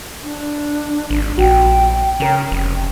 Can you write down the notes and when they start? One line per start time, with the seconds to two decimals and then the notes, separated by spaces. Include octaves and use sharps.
0.22 D4
1.10 G#1
1.38 A#1 F#4 G5
2.20 C#3 C#4 A#4
2.51 F1